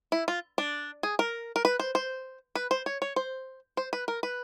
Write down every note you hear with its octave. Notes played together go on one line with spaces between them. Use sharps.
E4
F4
D4
G#4
A#4
A#4
B4
C5
C5
B4
C5
C#5
C#5
C5
C5
B4
A#4
B4